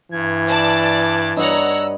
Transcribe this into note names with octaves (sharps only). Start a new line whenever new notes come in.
G2 E3 G#6
D5 A5
G2 C#5 D#5 F#5 A#5 E6